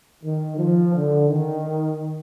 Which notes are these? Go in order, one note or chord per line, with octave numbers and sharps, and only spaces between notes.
D#3
F3
D3
D#3